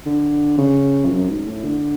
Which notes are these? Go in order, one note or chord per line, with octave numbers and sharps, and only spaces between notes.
D3
C#3
F2
F#2
G#2
A2
D3